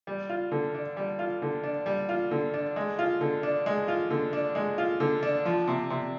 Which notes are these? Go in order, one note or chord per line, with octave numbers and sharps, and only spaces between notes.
G3
F4
D3
D4
G3
F4
D3
D4
G3
F4
D3
D4
G#3
F4
D3
D4
G#3
F4
D3
D4
G#3
F4
D3
D4
F3
C3
C3